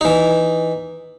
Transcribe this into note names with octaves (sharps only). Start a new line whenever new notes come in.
E3 D#4